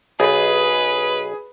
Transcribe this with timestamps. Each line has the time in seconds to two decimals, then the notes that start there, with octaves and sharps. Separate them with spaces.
0.20 B1 G#4 B4